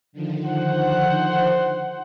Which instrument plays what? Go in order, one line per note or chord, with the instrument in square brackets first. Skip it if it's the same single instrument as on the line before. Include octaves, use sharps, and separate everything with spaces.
[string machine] D3 D#3 F3
[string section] C5 F#5